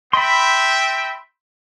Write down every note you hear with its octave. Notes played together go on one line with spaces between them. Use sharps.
C4 E5 G5 B5 C6